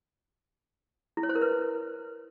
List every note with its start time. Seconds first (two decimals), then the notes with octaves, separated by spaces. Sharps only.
1.17 E4
1.23 C#5
1.29 C5
1.35 A#4
1.42 B4